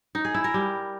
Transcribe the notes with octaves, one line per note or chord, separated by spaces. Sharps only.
D#4
G#4
E4
A#4
G3